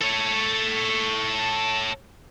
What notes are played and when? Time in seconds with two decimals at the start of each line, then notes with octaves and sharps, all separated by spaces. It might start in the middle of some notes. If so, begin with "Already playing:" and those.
0.02 A4 C#5